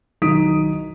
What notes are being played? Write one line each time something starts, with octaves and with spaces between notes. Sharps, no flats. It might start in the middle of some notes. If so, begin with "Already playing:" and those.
B1 D#3 D#4 D#6 B6 D7